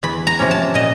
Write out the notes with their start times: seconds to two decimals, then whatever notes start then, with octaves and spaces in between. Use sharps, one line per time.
0.03 E2 B5
0.27 A#5
0.39 C3 F3 A#3 C#4
0.51 A5
0.74 A#2 D#5